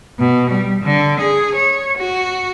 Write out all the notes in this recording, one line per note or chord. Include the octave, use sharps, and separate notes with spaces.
B2
G3
D3
G#4
C#5
F#4